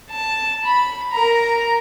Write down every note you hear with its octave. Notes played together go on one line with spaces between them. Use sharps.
A5
B5
A#4 A#5